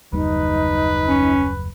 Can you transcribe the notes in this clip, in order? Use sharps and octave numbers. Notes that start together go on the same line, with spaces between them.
F#1 D#2 G3 D#4 B4
C#4